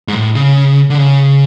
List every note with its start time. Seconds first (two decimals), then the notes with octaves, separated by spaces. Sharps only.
0.08 G#2
0.15 A2
0.35 C#3
0.90 D3
0.97 C#3